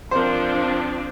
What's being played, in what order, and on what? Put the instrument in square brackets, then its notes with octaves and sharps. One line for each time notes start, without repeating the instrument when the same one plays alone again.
[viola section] F3 C4 D4 [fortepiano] A#4 C5